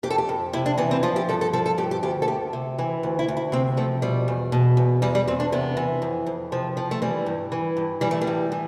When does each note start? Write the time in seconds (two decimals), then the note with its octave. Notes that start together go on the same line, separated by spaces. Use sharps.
0.03 F2 G4
0.10 A4
0.18 G4
0.29 F2
0.53 C3 E4
0.66 D4
0.78 E3 B3
0.91 C4
1.03 F3 F4
1.16 G4
1.29 G2 A4
1.41 A4
1.53 F3 A4
1.66 A4
1.78 G2 G4
1.91 G4
2.03 D2 G4
2.22 A4
2.28 D2 G4
2.53 C3
2.78 E3
3.03 D2
3.19 E4
3.28 D2
3.37 E4
3.52 C3 C4
3.77 F3 A3
4.02 B2 G3
4.28 E2
4.52 B2
4.77 E2
5.02 E2 G3
5.15 G3
5.28 E2 C4
5.40 D4
5.52 C3 B3
5.77 E3
6.02 F2
6.26 F2
6.52 C3 F3
6.77 F3
6.91 A3
7.02 E3 G3
7.26 G2
7.52 E3
7.77 G2
8.01 E3 G3
8.11 A3
8.21 G3
8.27 A2
8.52 E3